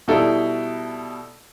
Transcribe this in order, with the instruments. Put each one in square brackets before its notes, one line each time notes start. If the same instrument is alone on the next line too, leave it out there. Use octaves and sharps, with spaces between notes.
[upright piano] B2 G3 D#4 E4 A4